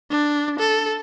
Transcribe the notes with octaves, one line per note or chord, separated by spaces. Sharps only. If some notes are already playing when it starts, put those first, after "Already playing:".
D4
A4